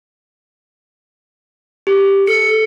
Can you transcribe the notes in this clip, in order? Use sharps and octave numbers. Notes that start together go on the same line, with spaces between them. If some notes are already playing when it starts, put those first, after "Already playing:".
G4
A4 C#7